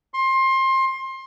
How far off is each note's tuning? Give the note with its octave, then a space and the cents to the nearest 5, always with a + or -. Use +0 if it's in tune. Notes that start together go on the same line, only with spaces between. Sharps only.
C6 +25